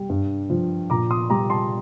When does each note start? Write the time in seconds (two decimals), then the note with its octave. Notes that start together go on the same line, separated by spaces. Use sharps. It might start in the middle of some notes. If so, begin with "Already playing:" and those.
Already playing: G3
0.10 G2
0.50 F3
0.90 A#2 A#5 D6
1.10 C6 D#6
1.30 G3 A#5 D6
1.50 A5 C6